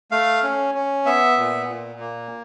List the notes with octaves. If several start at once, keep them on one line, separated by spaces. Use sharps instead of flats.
A3 F5
C#4
C#4
B3 E5
A#2
A#2
A#3